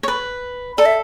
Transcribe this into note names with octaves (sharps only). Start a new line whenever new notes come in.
C#5
B4
A4 D5
E5